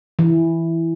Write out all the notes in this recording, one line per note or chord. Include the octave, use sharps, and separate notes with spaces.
E3